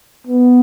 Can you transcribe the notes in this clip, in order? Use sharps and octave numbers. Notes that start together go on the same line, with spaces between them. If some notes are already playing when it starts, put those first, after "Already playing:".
B3